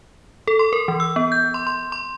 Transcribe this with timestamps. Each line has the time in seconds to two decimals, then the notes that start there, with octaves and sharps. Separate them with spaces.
0.47 A4
0.59 C6
0.73 A#4
0.88 E3
1.00 E6
1.16 B3
1.32 G6
1.54 C6
1.67 C6
1.92 C6